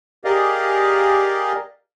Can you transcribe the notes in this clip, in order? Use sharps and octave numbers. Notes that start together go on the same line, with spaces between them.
G4 G#4 A#4 D5 D#5 F5